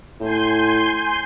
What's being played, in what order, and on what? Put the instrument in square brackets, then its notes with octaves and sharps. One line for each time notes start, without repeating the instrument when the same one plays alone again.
[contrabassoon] A2 [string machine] G#5 C6 G6